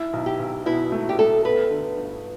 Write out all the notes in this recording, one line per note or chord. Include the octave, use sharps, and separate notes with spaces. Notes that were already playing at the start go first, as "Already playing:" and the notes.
Already playing: E4
B1
G4
B1
B2 E4
A3
G4
A3 A4
B3 B4
D3
G1